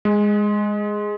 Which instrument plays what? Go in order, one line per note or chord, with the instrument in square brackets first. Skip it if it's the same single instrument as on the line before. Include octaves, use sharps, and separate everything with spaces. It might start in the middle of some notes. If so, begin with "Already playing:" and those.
[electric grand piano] G#3